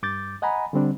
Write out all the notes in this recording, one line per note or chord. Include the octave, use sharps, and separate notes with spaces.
G2 D6 G6 A6
D#5 F#5 G#5 A#5 B5
D3 G3 C4 D4